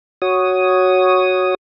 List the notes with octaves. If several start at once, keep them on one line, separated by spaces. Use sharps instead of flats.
F#4 C#5 D#6